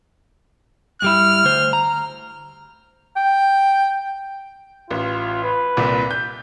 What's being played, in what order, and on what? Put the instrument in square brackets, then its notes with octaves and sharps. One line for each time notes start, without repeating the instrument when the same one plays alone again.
[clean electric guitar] G2 G3 E4 [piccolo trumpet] F6
[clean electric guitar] D2 C5
A#5
[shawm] G5
[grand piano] A1 [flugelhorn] F4
[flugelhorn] B4
[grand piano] C2 A#2
G6